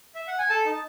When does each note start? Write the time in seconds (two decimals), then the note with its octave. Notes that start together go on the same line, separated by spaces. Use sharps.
0.15 E5
0.28 F#5
0.39 G#5
0.49 A4 A5
0.65 D#4